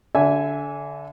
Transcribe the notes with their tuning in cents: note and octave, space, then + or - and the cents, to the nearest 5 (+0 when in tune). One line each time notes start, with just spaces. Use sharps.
D3 -25 E5 +0 G#5 +0